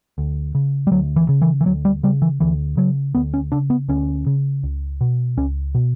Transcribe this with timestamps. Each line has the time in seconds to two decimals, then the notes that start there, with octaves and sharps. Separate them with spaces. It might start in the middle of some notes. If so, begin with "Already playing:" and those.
0.18 D2
0.55 C#3
0.87 G3
0.92 D2 F#3
1.16 E3
1.29 C#3
1.42 E3
1.61 E3
1.66 D2 F#3
1.85 G3
2.03 C#3 G3
2.22 E3
2.40 D2 E3
2.77 C#3 F#3
3.15 D2 B3
3.34 C#4
3.52 C#3 D4
3.70 B3
3.89 D2 C#4
4.26 C#3
4.63 C#2
5.01 B2
5.37 C#2 C#4
5.75 B2